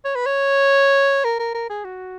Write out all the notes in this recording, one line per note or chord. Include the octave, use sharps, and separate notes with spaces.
C#5
B4
C#5
A#4
A#4
A#4
G#4
F#4